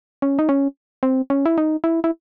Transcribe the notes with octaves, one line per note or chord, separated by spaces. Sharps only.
C#4
D#4
C#4
C4
C#4
E4
D#4
E4
E4